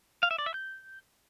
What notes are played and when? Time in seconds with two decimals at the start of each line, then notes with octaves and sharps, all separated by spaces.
0.23 F5
0.31 E5
0.38 D5
0.46 E5
0.54 G6